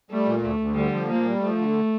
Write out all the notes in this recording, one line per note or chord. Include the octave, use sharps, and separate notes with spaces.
G3 A3
A#2
D2 A3
D2
D3 G3
F3
A#2 A#3
G3
F3 A3
D3